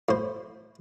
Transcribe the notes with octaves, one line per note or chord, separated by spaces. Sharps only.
A2 C5